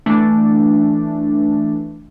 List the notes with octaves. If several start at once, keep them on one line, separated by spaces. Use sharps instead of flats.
E3 A3 D4